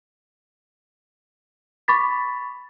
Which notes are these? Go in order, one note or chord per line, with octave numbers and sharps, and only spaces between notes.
B5 C#6 D6 A6 B6